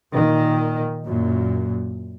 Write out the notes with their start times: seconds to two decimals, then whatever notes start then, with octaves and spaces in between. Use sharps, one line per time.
0.12 A#2 D#3
1.05 F#2 A#2